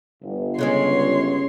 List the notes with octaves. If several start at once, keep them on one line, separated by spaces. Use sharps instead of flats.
G1
C#3 G#3 C#4 C#5 C6